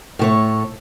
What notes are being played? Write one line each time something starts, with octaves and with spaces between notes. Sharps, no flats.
A2 A3 C#5